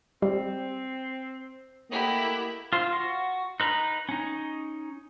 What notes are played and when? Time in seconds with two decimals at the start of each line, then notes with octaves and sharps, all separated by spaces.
0.22 G3 C4
1.91 A3 A#3 E4 G4 D#5 F#5
2.73 F4 C5
2.92 F#4
3.60 D#4 B4 A#5 B5
4.09 C#4 D#4